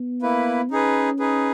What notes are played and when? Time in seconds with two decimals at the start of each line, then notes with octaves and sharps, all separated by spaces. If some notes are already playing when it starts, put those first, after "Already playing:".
Already playing: B3
0.22 A#3 E4 B4
0.70 C#4 D#4 G#4 B4
1.19 D#4 G#4 B4